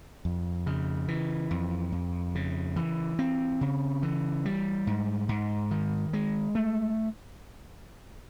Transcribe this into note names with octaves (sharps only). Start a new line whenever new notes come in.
F2
C#3
E3
F2
F2
C#3
E3
C4
C#3
E3
G3
G#2
G#2
D#3
G#3
A3